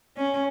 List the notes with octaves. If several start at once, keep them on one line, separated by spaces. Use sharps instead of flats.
C#4